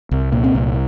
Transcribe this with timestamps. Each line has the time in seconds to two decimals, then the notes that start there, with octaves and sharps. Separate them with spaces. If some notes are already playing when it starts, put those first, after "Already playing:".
0.11 C2
0.33 A#2
0.44 C4
0.55 C2